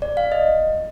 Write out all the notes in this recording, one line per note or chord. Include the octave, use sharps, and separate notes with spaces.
D5
F5
D#5